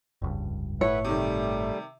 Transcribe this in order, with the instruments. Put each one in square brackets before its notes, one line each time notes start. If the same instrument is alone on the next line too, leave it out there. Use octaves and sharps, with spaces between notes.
[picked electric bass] F1 C#2 G2
[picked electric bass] G1 A2 [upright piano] E4 [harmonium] B4 E5 F#5 [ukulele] C#5
[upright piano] C3 D#3 [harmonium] G3 A3